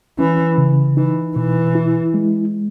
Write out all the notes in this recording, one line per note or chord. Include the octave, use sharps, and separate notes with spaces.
E3 C#4
C#3
E3 D#4
B2 E3
E4
G#3